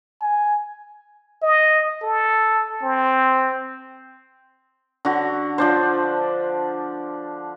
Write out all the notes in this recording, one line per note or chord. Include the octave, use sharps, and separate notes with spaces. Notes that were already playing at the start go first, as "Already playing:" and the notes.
G#5
D#5
A4
C4
D3 F#4
F3 D4 C5